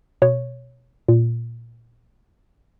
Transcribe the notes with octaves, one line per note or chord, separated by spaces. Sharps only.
B2 C#5
A#2